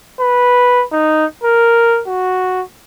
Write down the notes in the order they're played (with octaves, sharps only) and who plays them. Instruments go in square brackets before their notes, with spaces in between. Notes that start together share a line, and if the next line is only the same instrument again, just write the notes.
[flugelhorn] B4
D#4
A#4
F#4